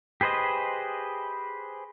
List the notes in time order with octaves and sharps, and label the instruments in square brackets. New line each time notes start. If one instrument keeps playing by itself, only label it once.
[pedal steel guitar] G4 G#4 B4 C5 D#5